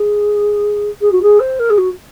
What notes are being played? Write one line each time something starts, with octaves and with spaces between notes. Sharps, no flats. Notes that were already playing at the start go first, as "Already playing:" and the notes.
Already playing: G#4
G#4
F#4
G#4
C5
A#4
G#4
F#4